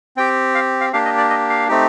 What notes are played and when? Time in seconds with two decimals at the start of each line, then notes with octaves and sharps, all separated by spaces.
0.17 C4 G4 G5
0.55 F5
0.81 F5
0.93 A#3 D4 G4 F5
1.05 D#5
1.18 D5
1.30 D#5
1.50 F5
1.68 A3 C4 D#4 G4